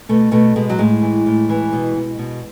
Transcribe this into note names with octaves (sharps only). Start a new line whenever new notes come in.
B2 A3
B2 A3
B2 G#3
F#3
A2 G#3
E3
A2
E3
B2
B2
B2